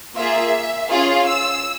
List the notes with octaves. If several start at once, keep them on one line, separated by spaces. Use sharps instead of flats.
A#3 F4 G#4 E5
C#4 F4 G#4 F5
E6